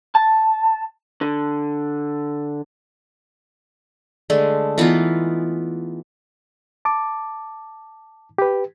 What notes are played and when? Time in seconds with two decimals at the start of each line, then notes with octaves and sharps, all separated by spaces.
0.15 A5
1.21 D3
4.30 D3 G#3 A3
4.78 E3 B3 D#4 F4
6.85 A5 D6
8.38 G4 B4